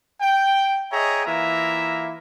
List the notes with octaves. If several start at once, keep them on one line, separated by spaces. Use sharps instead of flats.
G5
G#4 C#5 D#5 E5 G5 A#5
E3 A#3 E4 F4 E5 A#5